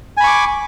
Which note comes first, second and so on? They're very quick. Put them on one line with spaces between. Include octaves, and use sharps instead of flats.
G#5 B5 C#6 D6